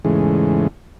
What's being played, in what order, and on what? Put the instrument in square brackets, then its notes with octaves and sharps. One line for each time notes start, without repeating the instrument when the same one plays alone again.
[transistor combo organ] E2 G#2 C#3 E3 G#3 A3